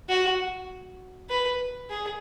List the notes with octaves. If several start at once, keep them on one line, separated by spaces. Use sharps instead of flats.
F#4
B4
G#4